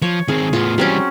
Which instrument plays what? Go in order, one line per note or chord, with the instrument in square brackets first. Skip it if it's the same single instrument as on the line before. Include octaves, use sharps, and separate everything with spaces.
[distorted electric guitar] F3 [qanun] C#5
[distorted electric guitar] D#3 C4 [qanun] G#4 F5
[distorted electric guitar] A2 B3 [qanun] F4
[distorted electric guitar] E3 G3 [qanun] F#3 C4 C#4